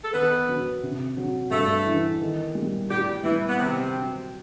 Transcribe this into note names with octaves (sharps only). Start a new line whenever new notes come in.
A4
D#3 B3 B4
F#3
C3
F#3
G2 A3 A4
E3
D#3
G3
A2 G3 G4
E3 G3 E4
B3
C3 D#3 C4
F#3